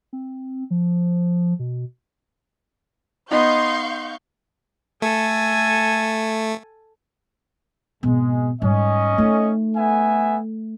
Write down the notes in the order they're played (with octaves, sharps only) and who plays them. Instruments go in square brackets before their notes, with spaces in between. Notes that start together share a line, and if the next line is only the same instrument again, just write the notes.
[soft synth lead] C4
F3
B2
[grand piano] B3 D#4 [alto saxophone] D#5 [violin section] F5 C#6 G6 [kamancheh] C6
[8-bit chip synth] A3 [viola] A4 G#5
[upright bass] G#1 B2 [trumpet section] G#3
[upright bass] G#2 G3 [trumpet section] C#4 D#5
[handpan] A3 [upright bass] D#4
[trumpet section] B3 E5 G#5